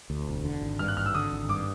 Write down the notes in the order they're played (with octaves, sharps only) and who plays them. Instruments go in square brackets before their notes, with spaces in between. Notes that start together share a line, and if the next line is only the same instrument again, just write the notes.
[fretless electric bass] D2
E1
D3
G#1
[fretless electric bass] G2 [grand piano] F6
[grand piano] F#6
[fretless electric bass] G#1 [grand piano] F6
[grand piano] E6
[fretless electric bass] D3 [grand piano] D#6
[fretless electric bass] G#1
[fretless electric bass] G2 [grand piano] D6